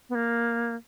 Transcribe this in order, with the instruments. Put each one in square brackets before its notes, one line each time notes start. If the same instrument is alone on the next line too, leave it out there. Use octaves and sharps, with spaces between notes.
[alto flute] B3
A#3